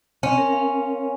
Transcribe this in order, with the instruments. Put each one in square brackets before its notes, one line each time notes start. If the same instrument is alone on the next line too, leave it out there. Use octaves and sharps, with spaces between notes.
[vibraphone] C4 [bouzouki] C#4
[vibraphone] A#4
F5